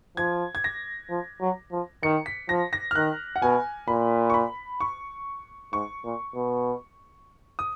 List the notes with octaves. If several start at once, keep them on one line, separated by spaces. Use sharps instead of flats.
F3 G#6
G#6
A#6
F3
F#3
F3
D#3 C#7
B6
F3 A#6
A#6
F6
D#3 F#6
F#5
B2 G#5
A#2 B5
C#6
B5
C#6
G#2 C#6
A#2
B2
D#6